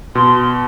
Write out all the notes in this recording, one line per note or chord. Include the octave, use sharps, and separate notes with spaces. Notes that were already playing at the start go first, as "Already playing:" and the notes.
B2 C6